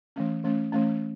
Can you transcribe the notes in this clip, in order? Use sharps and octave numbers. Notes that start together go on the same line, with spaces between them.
E3 A3 C#4
E3 A3 C#4
E3 A3 C#4